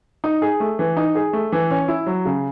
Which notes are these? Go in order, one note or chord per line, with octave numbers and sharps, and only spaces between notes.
D#4
G#4
A3
E3
D#4
G#4
A3
E3
C#4
E4
F#3
C#3